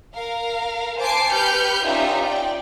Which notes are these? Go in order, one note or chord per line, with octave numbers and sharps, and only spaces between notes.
A#4 F5
C5 G#5 A5 D6 C7 D7
G4 B4 F6 G6 C#7
C#4 D#4 F4 G4 D5 E5
D5 G5